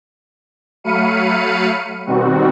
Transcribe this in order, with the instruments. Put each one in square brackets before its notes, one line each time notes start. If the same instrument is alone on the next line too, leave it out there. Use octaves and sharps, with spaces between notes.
[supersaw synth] F#3 A3 F5 B5 C#7 D#7
B2 D#3 G3 C4 F#4